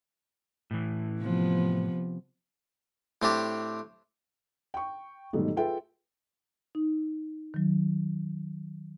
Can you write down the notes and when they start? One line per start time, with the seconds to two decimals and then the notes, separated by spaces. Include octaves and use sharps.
0.71 A2 E3
1.21 C3 F3 B3
3.22 A2 C4 D4 G4
4.74 G5 C#6
5.33 G#2 B2 D#3 F#3 G3 A3
5.57 F4 G#4 A4 B4 E5 G5
6.75 D#4
7.54 D#3 F#3